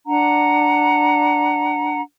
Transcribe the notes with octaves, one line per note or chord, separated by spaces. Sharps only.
D4 F#5 A#5